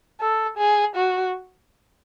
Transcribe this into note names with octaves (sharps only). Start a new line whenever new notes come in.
A4
G#4
F#4